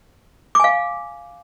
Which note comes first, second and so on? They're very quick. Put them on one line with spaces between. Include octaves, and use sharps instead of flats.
D6 G#5 F5